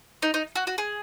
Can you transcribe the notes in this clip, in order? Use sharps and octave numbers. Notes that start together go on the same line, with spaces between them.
D#4
D#4
F#4
F#4
G#4